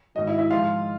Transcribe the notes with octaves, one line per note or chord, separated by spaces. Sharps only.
G#2 D#3 F#3 D#5
E4 E5
E4 E5
G#2 F3 G#3 F4 F5